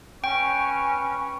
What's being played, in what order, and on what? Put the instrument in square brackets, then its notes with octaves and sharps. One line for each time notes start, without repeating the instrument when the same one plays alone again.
[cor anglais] C#4 [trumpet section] B4 B5 C#6 [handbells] G5